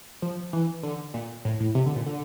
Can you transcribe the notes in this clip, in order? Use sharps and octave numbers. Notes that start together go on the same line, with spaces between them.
F3
E3
D3
A#2
A2
A2
C3
D3
A#2
D3